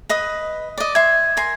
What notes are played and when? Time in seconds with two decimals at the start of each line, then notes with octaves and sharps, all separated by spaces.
0.09 B4 D#5 D#6
0.78 D5 D#5
0.95 E5 C6 G#6
1.37 A#4 G#5 C6